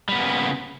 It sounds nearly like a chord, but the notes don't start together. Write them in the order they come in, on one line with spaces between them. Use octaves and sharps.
G3 B3 A#3 C#3